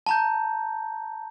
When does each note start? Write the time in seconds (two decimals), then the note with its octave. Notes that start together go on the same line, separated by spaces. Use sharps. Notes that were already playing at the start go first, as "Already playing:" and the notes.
0.06 A5 A#5 G6